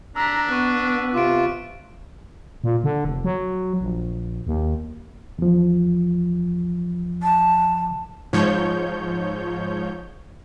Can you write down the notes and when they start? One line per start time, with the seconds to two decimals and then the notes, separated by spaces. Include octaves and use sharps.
0.16 D4 A#5 E6 B6
0.49 B3 C#6 F#6
1.14 C3 F4 D6 D7
2.64 A#2
2.84 D3
3.05 F1
3.25 F#3
3.81 A#1
4.47 D#2
5.39 E2 F3
7.23 A5
8.33 G#2 F3 C#5 G6